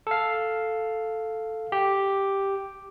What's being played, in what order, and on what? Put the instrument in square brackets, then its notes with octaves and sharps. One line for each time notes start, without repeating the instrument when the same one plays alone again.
[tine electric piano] A4 F5
G4